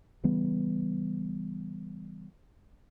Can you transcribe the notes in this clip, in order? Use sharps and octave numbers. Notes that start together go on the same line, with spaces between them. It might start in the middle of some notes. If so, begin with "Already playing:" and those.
C#3 E3 G3 B3